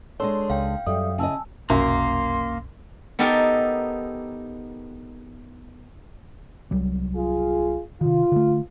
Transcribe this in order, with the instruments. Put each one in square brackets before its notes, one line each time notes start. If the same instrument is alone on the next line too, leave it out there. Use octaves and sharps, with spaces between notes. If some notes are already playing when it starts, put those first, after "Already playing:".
[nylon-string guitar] G#3 D4 A4 [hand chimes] C#5 C6
[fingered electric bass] C#2 [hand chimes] F5 G5
[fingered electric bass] F#2 [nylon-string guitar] G3 [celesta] A4 E5 D#6
[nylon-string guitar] C#3 E4 D#5 [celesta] G#5 A5 E6
[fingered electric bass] F1 B1 [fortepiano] F#2 [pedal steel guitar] A#3 [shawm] C6
[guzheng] B3 D#4 G4 A4 A#4
[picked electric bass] C2 F#3 G3
[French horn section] F4 G#4
[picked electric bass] C3 D#3 [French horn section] F4
[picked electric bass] D3 A3